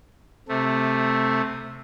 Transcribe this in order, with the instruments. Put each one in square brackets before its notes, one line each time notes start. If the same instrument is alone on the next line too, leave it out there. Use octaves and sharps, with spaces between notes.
[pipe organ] C3 A3